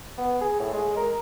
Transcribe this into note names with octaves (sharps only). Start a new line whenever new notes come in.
B3
G#4
A2
G#3
A#4